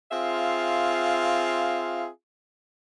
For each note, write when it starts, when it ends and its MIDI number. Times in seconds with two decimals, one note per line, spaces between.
0.12 2.08 60
0.12 2.08 65
0.12 2.08 68
0.12 2.08 76
0.12 2.08 77